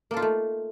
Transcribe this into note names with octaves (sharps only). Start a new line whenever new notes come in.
A3 A#3 D#4 F4 A4